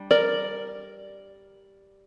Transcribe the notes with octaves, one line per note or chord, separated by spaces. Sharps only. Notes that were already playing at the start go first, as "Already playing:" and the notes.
Already playing: G3 D4
A#4 D5